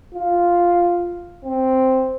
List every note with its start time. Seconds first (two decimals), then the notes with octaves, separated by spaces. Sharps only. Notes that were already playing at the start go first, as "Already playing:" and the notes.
0.14 F4
1.45 C4